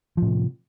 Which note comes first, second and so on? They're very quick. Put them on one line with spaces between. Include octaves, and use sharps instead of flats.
F3 A2 C3